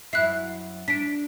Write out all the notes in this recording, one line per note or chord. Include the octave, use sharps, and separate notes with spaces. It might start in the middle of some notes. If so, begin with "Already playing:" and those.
F#2 E4 F#6 C7
D4 B6 D7